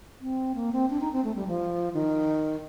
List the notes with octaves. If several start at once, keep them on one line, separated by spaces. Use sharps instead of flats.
C4
A#3
C4
D4
D#4
C4
A3
G3
F3
D#3